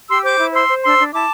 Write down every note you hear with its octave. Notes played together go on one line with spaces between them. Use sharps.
G4 C6 E6
C5 D6 G6
E4
C5 C6 E6
C5
D4 C6 E6
D4
E4 A5 D6